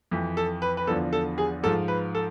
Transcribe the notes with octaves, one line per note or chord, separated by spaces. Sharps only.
F2 E3
A4
B4
B4
E2 D3 F3 A4
A4
G#4
G#2 F3 A4
B4
A4